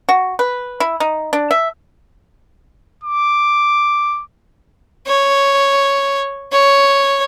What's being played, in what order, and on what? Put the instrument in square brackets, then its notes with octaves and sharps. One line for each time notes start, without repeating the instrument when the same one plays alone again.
[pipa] F#4
B4
E4
D#4
D4
E5
[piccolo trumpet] D6
[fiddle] C#5
C#5